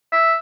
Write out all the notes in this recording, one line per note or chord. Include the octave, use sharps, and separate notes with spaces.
E5